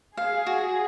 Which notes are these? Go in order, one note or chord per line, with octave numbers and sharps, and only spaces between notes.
G#4 F5
F#4